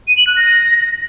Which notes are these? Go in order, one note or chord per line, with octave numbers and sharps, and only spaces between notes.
D#7
F#7
F#6
A#6